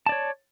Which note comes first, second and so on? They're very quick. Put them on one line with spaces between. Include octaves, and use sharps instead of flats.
A5 D5 C#5